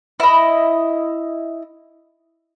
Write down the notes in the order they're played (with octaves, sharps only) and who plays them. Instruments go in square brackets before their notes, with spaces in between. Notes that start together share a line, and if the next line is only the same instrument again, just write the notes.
[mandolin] E4 D#5